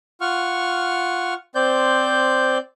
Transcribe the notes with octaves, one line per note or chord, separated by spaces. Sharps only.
F4 F#5 C#6 F6
C4 C5 D5 G6